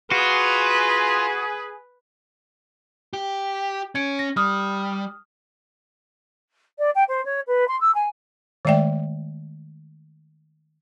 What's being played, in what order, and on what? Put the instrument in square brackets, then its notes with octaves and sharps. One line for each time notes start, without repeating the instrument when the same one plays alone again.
[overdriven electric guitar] F4 [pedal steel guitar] F#4 [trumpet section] G#4 [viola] B4
[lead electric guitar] G4
[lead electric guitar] C#4 [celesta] G#6 C#7 D7
[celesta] A#6
[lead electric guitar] G3 [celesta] D#6 F6
[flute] D5
G5
C5
C#5
B4
C6
E6
G#5
[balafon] D#3 G#3 A3 D5 E5 G5